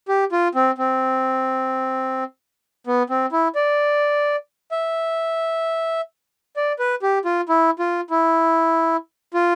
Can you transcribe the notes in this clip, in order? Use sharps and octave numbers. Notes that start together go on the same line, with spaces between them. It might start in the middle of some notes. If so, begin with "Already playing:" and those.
G4
F4
C4
C4
B3
C4
E4
D5
E5
D5
B4
G4
F4
E4
F4
E4
F4